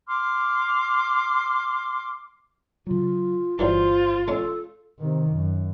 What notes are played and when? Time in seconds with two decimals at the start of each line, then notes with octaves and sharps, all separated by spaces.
0.08 C6 D6 F6
2.87 C#3 F#3 F4
3.59 G1 E3 F#3 G3 F4 C5
4.28 G#3 C#4 A4
4.99 C3 D#3
5.30 F#2